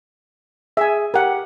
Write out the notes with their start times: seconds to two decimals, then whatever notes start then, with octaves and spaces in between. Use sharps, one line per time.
0.77 G#4 E5 G#5
1.14 G4 A#4 F#5